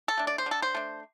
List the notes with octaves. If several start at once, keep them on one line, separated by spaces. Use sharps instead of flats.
A4
A3 D4
D5
C5
D3
A4
C5
A3 D4